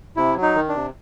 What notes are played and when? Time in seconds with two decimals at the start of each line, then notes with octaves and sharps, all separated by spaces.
0.17 C3 E4
0.36 F#3
0.42 D#4
0.55 D#3
0.69 D4
0.75 C3